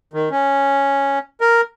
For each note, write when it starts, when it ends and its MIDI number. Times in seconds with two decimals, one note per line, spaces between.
0.14 0.29 51
0.31 1.19 61
1.41 1.61 70